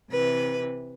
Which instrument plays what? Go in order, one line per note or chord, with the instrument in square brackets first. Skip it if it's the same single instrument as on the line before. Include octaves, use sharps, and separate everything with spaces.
[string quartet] C3 E3 B4